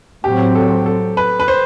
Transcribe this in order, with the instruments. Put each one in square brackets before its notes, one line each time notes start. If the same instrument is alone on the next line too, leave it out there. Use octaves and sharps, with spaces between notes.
[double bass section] A2 F#3 C4 [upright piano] G4
[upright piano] A4
A4
B4
B4
C5